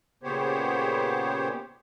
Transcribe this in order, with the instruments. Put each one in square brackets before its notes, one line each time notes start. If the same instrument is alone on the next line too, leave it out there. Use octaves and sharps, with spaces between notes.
[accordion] A#2 C#3 B3 G4 C5 C#5